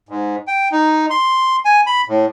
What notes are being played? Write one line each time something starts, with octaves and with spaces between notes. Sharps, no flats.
G#2
G5
D#4
C6
G#5
B5
A2